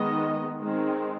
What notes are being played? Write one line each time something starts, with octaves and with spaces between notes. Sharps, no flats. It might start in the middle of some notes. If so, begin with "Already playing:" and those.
Already playing: D#3 G#3 B3 D#5
D#3 G#3 C4